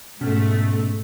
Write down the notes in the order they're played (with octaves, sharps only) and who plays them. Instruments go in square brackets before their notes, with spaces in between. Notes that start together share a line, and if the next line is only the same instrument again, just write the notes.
[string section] G#2 A3 [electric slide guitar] B2 C#4